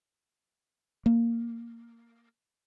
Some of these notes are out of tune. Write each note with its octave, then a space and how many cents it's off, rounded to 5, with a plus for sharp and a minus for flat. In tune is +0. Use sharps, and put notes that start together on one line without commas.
A#3 -5